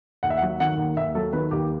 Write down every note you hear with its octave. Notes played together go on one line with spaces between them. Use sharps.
D#2 F#5
E5
F#5
F#3
D#3 F#5
D#2
D#2 E5
F#3 A4
D#3 B4
D#2 G4